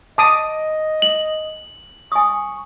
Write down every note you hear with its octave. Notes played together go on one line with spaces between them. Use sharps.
D#5 A5 D6 D#6
F#7
G#5 C#6 D#6